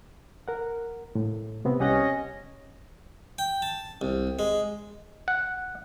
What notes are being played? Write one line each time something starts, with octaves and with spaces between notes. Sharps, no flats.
A#4 F#5
A2
C3 B3 C4
C2 C#4 G4 D#5 F#5
G5
A5
C2
G#3
F#5